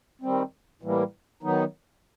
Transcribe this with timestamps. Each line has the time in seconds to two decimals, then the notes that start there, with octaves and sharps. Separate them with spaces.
0.22 D#3 G3 C4
0.82 A2 E3 G3 A#3
1.43 D#3 F#3 B3 D#4